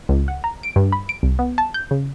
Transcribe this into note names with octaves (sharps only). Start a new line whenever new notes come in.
C#2
F#5
A#5
D7
G2
B5
D7
C2
B3
A5
G6
C#3